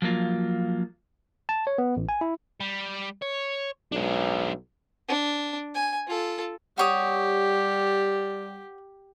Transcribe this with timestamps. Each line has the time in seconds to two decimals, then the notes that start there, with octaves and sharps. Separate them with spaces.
0.02 F3 F#3 A#3 F4
1.49 A5
1.67 C#5
1.78 B3
1.97 A1
2.09 G#5
2.21 E4
2.60 G3
3.22 C#5
3.92 B1 G#3 D4
5.09 D4
5.75 G#5
6.07 F4 A4
6.78 G3 F#4 G4 C#5 D#6